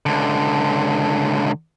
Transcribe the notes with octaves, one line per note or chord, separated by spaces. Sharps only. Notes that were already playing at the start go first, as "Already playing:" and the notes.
C#2 D3